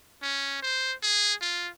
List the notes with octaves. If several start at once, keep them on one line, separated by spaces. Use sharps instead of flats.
C#4
C5
G#4
F4